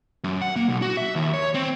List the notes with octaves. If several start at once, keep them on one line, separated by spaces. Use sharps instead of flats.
F#2
F#5
A#3
B1
F#4
E5
D#2
C#5
C4